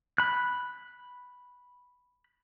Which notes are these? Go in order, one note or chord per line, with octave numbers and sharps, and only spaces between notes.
B5 F#6